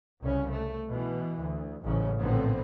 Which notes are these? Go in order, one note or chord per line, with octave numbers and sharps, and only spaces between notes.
C2 C#3 C#4
A3
B2 E3
D2
A1 G#2 C#3
A#1 A2 D3 B3 C4